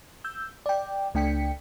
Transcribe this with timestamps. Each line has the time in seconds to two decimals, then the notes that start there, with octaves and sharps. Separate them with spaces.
0.24 E6 G6
0.66 D5 G5
1.14 C#2 A3 D4 G5 B6 C#7